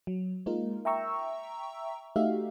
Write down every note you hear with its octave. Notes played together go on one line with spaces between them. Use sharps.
F#3
G#3 A#3 D#4 F4 A#4
E5 G5 A#5 C#6 E6
A3 D#4 F#4 G4 E5 F5